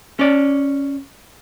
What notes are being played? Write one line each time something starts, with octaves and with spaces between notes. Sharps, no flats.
C#4 D5